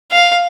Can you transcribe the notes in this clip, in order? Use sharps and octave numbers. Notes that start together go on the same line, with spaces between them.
F5